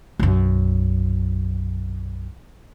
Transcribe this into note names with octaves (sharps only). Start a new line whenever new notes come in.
B1 F#2